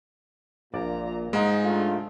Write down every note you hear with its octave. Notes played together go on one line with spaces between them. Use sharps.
A#1 A#2 D5 A#5
G#2 G#3 D#4 F5 G#5
A3 D4 F4